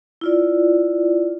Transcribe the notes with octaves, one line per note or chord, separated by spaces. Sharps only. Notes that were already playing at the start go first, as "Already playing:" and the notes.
E4 F4 D5